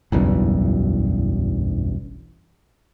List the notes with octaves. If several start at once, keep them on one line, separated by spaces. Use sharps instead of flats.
F#1 B1 E2 G2